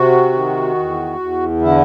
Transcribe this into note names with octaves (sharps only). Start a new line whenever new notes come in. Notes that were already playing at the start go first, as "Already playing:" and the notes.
Already playing: C3 F#4
D#3
E2
E2
D3 E4